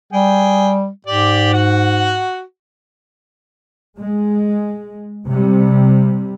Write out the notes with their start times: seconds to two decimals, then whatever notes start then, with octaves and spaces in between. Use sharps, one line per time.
0.13 G3 G#4 G5
1.07 G#2 G4 D5
1.53 F#4 F#5
3.99 G#3
5.26 C3 G3